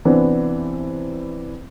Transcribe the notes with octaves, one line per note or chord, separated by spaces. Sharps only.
C3 E3 B3 C4 D4